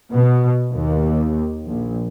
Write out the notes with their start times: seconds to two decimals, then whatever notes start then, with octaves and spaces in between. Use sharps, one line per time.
0.11 B2
0.71 D#2
1.66 A#1